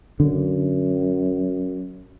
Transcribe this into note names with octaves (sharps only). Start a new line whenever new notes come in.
F#2 D3